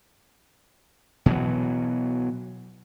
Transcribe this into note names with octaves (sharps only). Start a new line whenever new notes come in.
B2 E3 F#3